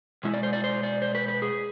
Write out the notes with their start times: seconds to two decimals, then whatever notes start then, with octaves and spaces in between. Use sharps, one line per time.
0.23 B2 G#3 E4
0.34 D5
0.43 C5
0.53 D5
0.64 C5
0.83 D5
1.02 C5
1.15 B4
1.28 B4
1.42 G#4